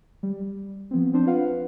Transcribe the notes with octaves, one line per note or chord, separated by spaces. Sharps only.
G3
F3 B3 C4
C4 D4 C5
F4 B4 F5 F#5